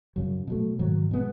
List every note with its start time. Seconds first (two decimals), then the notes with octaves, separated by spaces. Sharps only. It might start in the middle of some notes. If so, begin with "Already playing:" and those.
0.16 F#2 C#3 F#3
0.47 B2 F#3 A3
0.79 G#2 D#3 F#3
1.11 B2 G#3 B3